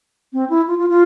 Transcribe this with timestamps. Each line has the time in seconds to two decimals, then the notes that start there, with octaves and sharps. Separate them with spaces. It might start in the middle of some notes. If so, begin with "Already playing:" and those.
0.33 C4
0.50 E4
0.67 F4
0.79 F4
0.89 F4